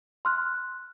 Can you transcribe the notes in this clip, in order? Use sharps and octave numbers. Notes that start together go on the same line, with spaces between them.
C6 F6 F#6